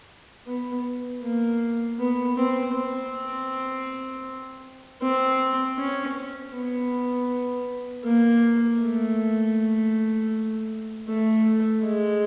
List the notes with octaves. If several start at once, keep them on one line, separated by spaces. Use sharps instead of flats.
B3
A#3
B3
C4
C4
C4
C#4
B3
A#3
A3
A3
G#3